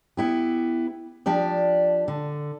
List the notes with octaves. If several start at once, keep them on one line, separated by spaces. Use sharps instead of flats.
B3 E4 G4
F3 D4 G4 D5
D3